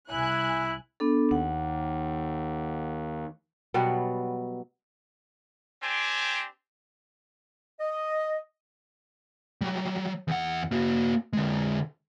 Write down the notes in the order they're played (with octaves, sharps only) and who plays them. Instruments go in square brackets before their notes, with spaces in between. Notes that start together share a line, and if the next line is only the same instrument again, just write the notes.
[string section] C2 G#5 F#6 [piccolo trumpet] E4
[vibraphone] B3 D4 A4
[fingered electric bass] D#2 [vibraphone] F#5
[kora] B2 F#3 G3 B3
[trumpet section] C4 D4 G4 C5 G#5
[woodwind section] D#5
[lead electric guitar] F#3 G3
E2 F#5
A#3 F#4
D3 G#3